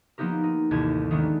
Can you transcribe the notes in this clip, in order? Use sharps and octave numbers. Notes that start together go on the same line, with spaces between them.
F3 A#3 B3 D#4 G4 A#4
D#4
A1 D#2 C3 E4 A5 G#6
D#3 G#3 A3 B3 D4